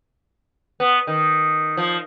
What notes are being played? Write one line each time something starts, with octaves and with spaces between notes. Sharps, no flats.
B3
D#3
F3